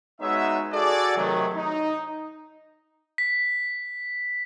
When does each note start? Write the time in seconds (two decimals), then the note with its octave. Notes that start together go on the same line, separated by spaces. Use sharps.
0.21 G#3 B3 D#4 F#4 C#5 E5
0.73 F#4 G#4 A4 D5
1.17 C3 D#3 F#3 A3
1.56 D#4
3.18 B6